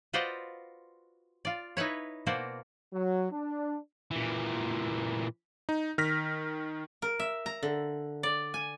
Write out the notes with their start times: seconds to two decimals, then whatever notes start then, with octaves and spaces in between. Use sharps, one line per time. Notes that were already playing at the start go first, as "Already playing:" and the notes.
0.13 F4 F#4 B4 C5 D5 D#5
1.45 F4 D5
1.77 D#4 E4 B4 C#5
2.26 B2 A#3 F#4 C5 D5
2.93 F#3
3.32 D4
4.11 A#2 E3
5.69 D#4
5.98 D#3 F6 A#6 B6
7.02 A#4
7.20 E5
7.46 A#5
7.63 D3
8.23 D5
8.54 G#5